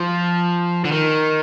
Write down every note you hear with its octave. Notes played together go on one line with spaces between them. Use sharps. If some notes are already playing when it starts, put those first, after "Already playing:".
Already playing: F3
D3
D#3